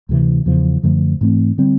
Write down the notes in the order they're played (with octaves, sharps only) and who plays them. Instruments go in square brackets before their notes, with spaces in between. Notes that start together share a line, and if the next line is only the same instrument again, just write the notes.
[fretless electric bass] D2 C3 E3
E2 C#3 F3
F#2 D3 F3 A3
G#2 E3 A3 C4
D3 G3 C4